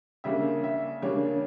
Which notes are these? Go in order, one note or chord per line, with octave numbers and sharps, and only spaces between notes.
C#3 G3 A#3 D4 E5
E5
C#3 G3 A#3 D4 C#5